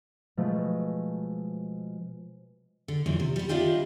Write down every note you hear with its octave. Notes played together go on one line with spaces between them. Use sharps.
B2 F3 G#3 A3
D3
F#2 A#2 D#3 E3 C4
C3
G3 B3
C4 D4 E4 F4 G4 D#5